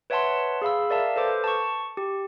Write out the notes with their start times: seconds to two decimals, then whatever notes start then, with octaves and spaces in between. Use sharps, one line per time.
0.10 B4 C#5 E5 F#5 A5 C6
0.62 G#4 F5 B5 E6
0.90 A#4 D5 E5 F5 A5
1.16 A4 B4 C5 D6
1.44 A5 C#6
1.97 G4